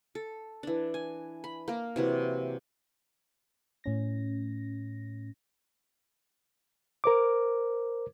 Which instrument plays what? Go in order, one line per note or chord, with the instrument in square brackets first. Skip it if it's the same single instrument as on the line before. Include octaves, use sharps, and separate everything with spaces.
[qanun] A4
E3 D4
G#5
B5
A#3 A#4
C3 E3 F#3
[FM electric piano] A2 C#4 A#6
[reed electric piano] A#4 C5 D6